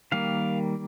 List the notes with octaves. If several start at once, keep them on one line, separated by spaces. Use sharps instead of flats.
D#3 G3 A#3 F5